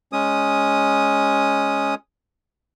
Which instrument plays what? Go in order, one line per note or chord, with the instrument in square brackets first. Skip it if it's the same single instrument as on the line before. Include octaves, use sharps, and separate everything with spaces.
[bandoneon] G#3 C#4 D#6